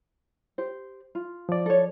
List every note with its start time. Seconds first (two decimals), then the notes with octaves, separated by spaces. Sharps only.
0.58 G4 C5
1.15 F4
1.49 F3 D5
1.66 A4 C#5